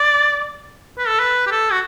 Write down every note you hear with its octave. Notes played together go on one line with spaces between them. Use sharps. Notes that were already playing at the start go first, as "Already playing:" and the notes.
Already playing: D5
B4
A4
B4
G4
A4
F#4